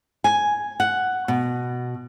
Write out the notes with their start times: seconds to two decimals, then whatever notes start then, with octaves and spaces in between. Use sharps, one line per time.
0.24 G#5
0.80 F#5
1.28 B2